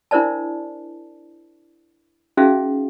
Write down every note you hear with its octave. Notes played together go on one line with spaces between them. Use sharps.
D4 E4 A#4 C5 D5 A5
C#4 D#4 F#4 G#4 E5 F5